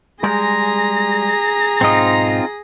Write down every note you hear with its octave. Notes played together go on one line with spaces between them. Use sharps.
G3 G#3 G#4 A#5 A#6
B1 G#2 C4 D#4 F4 D#5